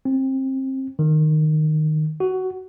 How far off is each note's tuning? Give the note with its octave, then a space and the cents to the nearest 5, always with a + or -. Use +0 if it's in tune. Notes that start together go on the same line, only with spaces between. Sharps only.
C4 +25
D#3 -15
F#4 +15